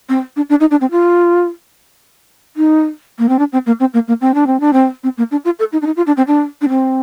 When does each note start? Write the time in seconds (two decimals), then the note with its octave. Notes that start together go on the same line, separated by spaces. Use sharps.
0.09 C4
0.36 D4
0.49 D4
0.60 D#4
0.71 D4
0.81 C4
0.91 F4
2.56 D#4
3.19 A#3
3.29 C4
3.39 D4
3.53 C4
3.66 A#3
3.80 C4
3.94 A#3
4.08 A#3
4.21 C4
4.34 D4
4.47 C4
4.60 D4
4.73 C4
5.03 C4
5.18 A#3
5.31 D4
5.45 F4
5.59 A4
5.72 D#4
5.82 D4
5.86 D#4
5.96 F4
6.07 D4
6.17 C4
6.27 D4
6.61 D4
6.69 C4